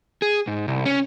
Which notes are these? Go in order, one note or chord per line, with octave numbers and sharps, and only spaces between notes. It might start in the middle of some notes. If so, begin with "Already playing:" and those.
G#4
G#2
C2
C#4